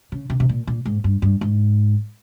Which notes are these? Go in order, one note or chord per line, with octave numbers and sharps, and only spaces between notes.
C#3
C3
C3
A#2
A#2
G#2
G2
G2
G#2